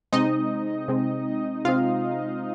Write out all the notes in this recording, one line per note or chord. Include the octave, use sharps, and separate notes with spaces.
C3 G#3 C4 D#4 D#5
C3 G#3 C4
C3 G#3 C4 F4 F5